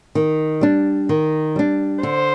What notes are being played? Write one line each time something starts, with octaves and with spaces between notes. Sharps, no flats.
D#3
G3 D4
D#3
G3 D4
D3 C5